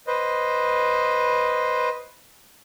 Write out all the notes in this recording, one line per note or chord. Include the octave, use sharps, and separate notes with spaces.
B4 C5 D#5